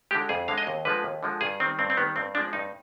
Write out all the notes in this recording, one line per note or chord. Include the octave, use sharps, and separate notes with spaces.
D3 G#3 G4
F2 G#4
D3 G#3 F5
D#5
D#2
D3 F3 G#3 B4
D#2
D3 F3 G#3
G2 G#4
D#3 G3 C4
G2 C4
C4
D#3 G3 B3
G2 C4
F3 G#3 D4
G2 D#4